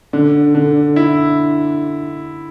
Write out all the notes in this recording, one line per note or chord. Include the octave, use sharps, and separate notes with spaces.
D3 D4
D3
E4